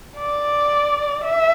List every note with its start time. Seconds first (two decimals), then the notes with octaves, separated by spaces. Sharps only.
0.18 D5
1.24 E5